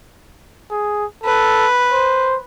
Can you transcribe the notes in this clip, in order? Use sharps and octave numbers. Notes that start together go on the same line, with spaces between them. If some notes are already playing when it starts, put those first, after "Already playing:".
G#4
A4 B4
C5